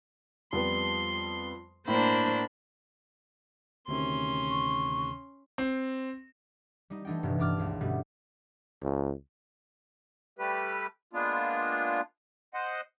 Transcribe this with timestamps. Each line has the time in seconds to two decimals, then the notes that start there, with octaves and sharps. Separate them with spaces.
0.53 F2 G3 B3 C6
1.88 A2 A#3 D4 A#4 C5 B5
3.88 D2 C3 D#3 C#4 C6
4.50 C#6
5.58 C4
6.90 G3 D#4
7.05 E3 A3 D4 D#4 G5
7.23 D#1 A1 G2 C3
7.39 G2 D4 D6 F6
7.57 E1 C#2
7.81 G2 B2 D3 G3 A3
8.82 C#2
10.39 G3 A3 G4 B4
11.13 G#3 A#3 B3 D4 F4
12.54 C5 D#5 F#5